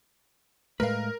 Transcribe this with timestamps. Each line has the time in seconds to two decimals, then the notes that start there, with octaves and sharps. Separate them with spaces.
0.80 A2 G#3 A3 A#4 B4 F5